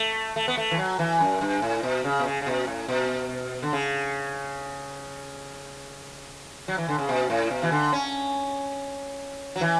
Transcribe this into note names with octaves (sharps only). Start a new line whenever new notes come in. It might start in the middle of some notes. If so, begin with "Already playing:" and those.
Already playing: A3
A3
B3
A3
E3
F#3
E3
F#2
G2
A2
B2
C#3
B2
C#3
C#3
B2
A2
B2
D3
C#3
F#3
E3
D3
C#3
B2
A2
B2
E3
D3
C#4
F#3
E3